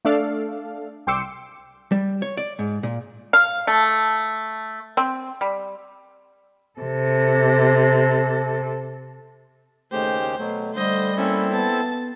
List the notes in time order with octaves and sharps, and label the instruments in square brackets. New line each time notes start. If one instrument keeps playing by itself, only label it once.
[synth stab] A3 D4 A4 D5 F5
C2 G5 C6 D6 E6 C#7
[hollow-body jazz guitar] G3
C#5
D5
G#2
A#2
[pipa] F5
A3
C4
G3
[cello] C3 A4
[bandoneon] D#2 C#3 G4 [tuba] A3 [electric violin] C5
[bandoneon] B2 F#3 [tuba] A3
[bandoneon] D3 [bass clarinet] G3 [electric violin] C5 D#5
[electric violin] A#3 C#4 [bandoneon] C4 E4 A4
[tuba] B3 [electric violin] A5